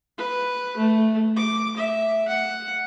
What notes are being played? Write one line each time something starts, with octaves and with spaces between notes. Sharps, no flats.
B4
A3
D6
E5
F#5